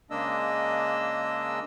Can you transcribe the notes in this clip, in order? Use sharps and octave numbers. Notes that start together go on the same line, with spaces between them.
C#3 G#3 A#3 D4 D#5 E6